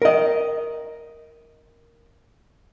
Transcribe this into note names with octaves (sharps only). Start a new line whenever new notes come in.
A#4 D#5